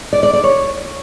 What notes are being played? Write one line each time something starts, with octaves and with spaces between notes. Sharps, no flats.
D5
D5
D5
C#5